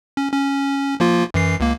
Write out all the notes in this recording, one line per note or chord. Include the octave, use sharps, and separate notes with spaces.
C#4
C#4
F3 A#3 F4
F#2 E3 C7
C#2 A#3